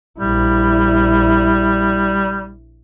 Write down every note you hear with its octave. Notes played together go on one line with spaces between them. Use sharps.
A#1 G3 E4